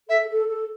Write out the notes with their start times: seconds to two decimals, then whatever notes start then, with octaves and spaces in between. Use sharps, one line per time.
0.09 A4 E5
0.29 A4
0.48 A4